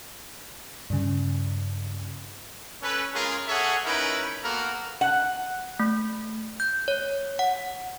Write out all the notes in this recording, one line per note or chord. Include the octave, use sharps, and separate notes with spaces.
G2 C#3
C#4 A4 B4
G#3 C#4 F4 G#4 A#4
G#4 A4 C#5 E5 F#5
C#4 D#4 E4 A#4 B4
A#3 B3 F#4 A4 A#4
F#5
A3
G6
C#5
F#5